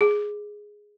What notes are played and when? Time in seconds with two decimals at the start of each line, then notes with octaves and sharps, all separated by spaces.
0.01 G#4